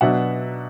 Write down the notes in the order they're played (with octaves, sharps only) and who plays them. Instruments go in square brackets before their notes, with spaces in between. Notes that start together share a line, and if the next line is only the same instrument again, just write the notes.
[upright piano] B2 F#3 B3 D4 E5 F#5